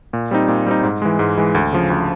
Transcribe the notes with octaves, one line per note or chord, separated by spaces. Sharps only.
A#2
G3 C4 D#4
A#2
G3 C4 D#4
G#2
E3 G#3
G#2
E3 G#3
D2
C#3 F3
D2